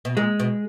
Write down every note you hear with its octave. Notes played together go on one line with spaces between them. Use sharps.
B2
A#2 G#3
B2